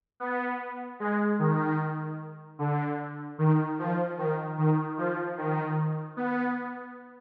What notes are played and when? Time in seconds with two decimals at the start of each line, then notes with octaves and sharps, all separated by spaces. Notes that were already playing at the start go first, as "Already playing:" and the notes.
0.20 B3
1.00 G#3
1.39 D#3
2.59 D3
3.38 D#3
3.79 F3
4.18 D#3
4.58 D#3
4.98 F3
5.38 D#3
6.17 B3